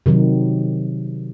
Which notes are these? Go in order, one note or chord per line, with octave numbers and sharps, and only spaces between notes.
C3 D#3 F#3